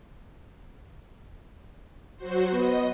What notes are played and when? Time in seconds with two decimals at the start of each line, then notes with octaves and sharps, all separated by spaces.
2.18 F#3 F#4 C5
2.53 B3 D#5